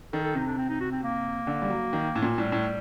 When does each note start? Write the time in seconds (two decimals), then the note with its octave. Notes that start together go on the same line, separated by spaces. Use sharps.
0.13 D#3 A4
0.24 A4
0.35 C3 D#4
0.46 D4
0.58 C4
0.69 D#4
0.80 F#4
0.92 C4
1.03 A#3
1.47 D3
1.62 G3
1.70 F#3
1.93 D#3
2.15 A2
2.22 A#2
2.38 A2 G3
2.52 A2